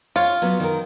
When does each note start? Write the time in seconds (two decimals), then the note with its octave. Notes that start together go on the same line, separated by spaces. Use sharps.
0.16 F4 C#5
0.42 F#3 B3
0.60 D#3 A#4